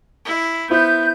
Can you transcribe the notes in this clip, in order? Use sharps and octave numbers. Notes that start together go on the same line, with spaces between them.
E4
B3 E4 C5 G6